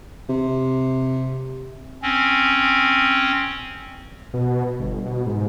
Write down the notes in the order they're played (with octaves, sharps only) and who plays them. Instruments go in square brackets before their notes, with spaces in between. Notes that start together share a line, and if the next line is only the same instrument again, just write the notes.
[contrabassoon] C3
[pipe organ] C4 C#4
[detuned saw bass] B2
G1
B2
G#2